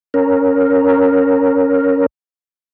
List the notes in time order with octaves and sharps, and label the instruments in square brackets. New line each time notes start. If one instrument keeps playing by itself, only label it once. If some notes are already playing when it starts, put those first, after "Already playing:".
[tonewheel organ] C#4 A#4